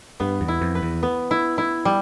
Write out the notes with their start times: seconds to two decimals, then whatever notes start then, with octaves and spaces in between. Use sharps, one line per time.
0.20 G2 B3
0.41 E2
0.48 E4
0.61 F2
0.75 B4
0.82 E2
1.03 B3
1.31 E4
1.58 E4
1.85 G3